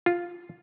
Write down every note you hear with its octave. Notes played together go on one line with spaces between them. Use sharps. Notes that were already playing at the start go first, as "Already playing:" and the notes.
F4